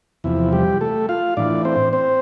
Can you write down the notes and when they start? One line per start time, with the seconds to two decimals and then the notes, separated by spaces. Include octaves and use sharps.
0.24 E2 C3 F3 E4
0.53 G3 G4
0.81 A3 A4
1.09 F4 F5
1.37 A2 E3 D4 D5
1.65 C4 C5
1.93 C4 C5